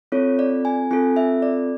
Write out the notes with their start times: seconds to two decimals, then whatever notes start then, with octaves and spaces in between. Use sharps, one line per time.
0.12 C4 F4 A4 C#5
0.39 D5
0.65 G#5
0.91 C4 F4 A4 G#5
1.16 E5
1.42 D5